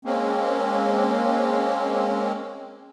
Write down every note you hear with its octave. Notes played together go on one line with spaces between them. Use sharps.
G#3 A#3 C4 C#4